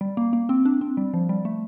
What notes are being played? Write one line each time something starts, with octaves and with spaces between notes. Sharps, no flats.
G3
A#3
A#3
C4
D4
C4
G3
F3
G3
A3